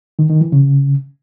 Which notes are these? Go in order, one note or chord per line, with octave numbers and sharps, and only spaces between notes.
D#3
D#3
E3
C#3